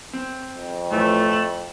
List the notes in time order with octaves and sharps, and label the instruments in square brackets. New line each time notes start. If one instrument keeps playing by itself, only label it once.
[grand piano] C4
[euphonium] F2
[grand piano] A2 E3 F3 [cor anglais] A3
[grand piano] E7 F#7